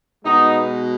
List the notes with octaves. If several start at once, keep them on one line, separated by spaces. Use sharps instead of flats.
B2 G#3 B3 D#4